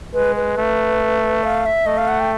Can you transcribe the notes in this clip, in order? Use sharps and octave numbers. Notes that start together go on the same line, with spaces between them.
G#3 B4
B4
A3
F5
E5
A3 D#5
F5
F#5
G5